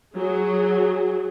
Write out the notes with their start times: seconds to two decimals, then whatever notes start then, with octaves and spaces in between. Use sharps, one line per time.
0.15 F#3 G#4